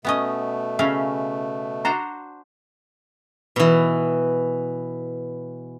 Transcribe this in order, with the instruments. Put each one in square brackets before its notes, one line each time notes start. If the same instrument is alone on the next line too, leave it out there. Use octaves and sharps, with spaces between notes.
[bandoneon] B2 A3 [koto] B3 C#4 D#5
[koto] C#3 C#4 F5 [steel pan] E5
[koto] D4 F#4 C5 [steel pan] A#5
[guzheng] B2 E3